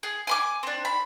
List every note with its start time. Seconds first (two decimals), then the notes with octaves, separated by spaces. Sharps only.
0.03 G#4
0.27 G#5 B5 D6
0.63 C4 D4
0.85 B5